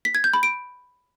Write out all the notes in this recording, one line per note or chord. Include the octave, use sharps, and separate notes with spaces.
B6
G#6
G6
B5
D7